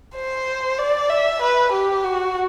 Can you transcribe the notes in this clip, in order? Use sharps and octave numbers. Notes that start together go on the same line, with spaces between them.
C5
D5
E5
B4
G4
F#4